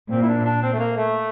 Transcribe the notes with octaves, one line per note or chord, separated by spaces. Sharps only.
A#2 C4
E4
D4
D4
C4
A3
A#3
A3